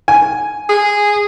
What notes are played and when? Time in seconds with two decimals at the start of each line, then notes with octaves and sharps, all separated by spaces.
0.08 G#5
0.69 G#4